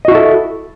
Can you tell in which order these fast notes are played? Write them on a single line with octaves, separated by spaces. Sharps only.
D#5 F#4 E4 A4